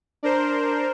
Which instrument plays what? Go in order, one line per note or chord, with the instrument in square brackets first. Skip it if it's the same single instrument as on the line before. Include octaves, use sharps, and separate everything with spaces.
[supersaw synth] D4 A#4 C5